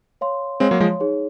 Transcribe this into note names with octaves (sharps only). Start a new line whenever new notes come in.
C#5 F5 C6
G#3 C4 C#5 F5 C6
F#3 A#3
F3 G#3
D#4 G#4 C#5